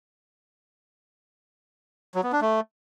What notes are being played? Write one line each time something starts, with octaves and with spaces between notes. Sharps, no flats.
F#3
B3
D4
A3